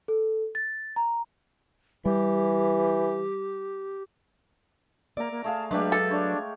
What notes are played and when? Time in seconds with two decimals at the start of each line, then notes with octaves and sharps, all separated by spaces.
0.08 A4
0.55 A6
0.96 A#5
2.06 E3 G3 G4
5.17 A#3 D5 E5 A#5
5.31 A#3
5.44 A3 G#4 F5 A5
5.71 F#3 G#3 A3 D4 G4 B4
5.92 A4
6.11 D4 C#5